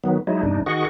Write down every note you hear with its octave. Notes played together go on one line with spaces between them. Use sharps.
D#3 F#3 B3
F#3 G#3 D#4 E4
E2 G2 C3 D4 D#4
D#3 F#4 G#4 D#5 F#5 C#6